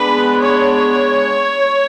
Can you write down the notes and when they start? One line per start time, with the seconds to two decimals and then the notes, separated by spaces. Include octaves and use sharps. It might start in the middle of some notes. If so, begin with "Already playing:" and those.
Already playing: G#3 B3 D4 B4
0.40 C#5